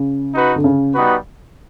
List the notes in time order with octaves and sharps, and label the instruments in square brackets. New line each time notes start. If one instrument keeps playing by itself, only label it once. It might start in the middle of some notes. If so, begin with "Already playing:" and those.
Already playing: [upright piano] C#3
[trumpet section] D#4 F#4 B4
[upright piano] D3
C#3
[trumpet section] G3 B3 D#4 F#4 B4